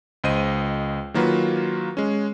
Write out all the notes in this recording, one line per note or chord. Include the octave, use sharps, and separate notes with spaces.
C#2 C5 D#5 D#7
D#3 F#3 A#3 F4 F#4 B4
G#3 C#4